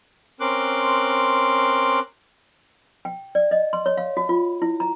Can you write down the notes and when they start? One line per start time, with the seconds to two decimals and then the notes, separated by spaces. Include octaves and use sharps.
0.40 C4 C#4 A#4 C6 D6 F#6
3.05 G5
3.35 D5
3.51 D#5
3.73 C6
3.86 C#5
3.97 F5
4.17 F#4
4.29 F4
4.62 E4
4.80 A#5